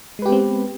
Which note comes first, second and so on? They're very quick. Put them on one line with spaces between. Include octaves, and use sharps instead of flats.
G#3 B4 G4 B3 C4